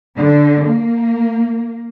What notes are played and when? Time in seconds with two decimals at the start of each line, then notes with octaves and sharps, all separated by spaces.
0.17 D3
0.67 A#3